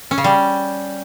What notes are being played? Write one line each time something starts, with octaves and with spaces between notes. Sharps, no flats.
C#4
C#3
G3